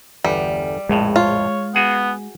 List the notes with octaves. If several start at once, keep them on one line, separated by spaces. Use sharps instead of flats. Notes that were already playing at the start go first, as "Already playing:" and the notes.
G1 E2 G3
A#1 F2 A2 G#3
F4 C#5
B3 F#4 G#4 F#5